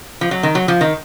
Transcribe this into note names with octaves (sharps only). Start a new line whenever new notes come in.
F3
F#3
D#3
F#3
F3
D#3